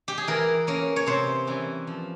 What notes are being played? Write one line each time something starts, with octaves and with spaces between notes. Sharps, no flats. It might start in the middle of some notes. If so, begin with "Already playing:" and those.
G4
G#4
E3 A#4
A#3 C#4 A#4
C#5
C3 C5
E3 G3 C#4
F3